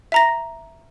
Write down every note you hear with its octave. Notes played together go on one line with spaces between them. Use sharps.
E5 A#5 A#6